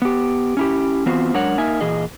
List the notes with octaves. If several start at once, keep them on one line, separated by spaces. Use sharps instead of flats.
B3 G4
C#4 E4 G4
E3 B3 C4 F4 F#4 C5
F#2 G#3 D4 A#4 C#5 F#5
A#3 D#4 A#4 E5 G#5
A#2 E3 G#4 D#5